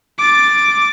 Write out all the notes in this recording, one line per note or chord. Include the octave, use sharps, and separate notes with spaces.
D6 A6